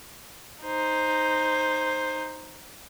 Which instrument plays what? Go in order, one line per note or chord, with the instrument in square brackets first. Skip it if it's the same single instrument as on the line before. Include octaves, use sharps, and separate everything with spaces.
[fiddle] D#4 C5